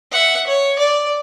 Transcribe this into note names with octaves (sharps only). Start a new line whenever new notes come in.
E5 F#5
C#5
D5